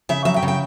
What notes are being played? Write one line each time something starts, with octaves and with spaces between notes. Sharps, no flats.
C#3 E5
F#3 E5
G5
C#3
G5